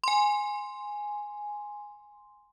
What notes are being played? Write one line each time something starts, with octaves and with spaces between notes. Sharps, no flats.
G#5 C6